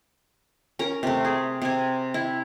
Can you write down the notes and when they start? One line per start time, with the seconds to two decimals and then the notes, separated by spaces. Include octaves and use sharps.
0.79 C#4 A#4 A#5
1.03 C3 A3
1.25 G#4
1.62 C3 G#5
2.14 E4